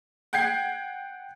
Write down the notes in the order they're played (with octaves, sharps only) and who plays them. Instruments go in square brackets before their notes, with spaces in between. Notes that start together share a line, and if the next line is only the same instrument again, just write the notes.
[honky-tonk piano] F#5 G5 G6 G#6 C7